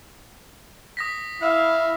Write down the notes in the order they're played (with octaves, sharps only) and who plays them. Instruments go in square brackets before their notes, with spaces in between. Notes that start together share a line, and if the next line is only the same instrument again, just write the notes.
[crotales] D#6 A#6 B6
[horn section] E4 E5 F5